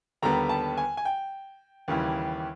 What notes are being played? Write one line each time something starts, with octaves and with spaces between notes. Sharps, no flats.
D#2 D3 G3 B3 A#5
A5
G#5
G#5
G5
D#2 C#3 E3 G3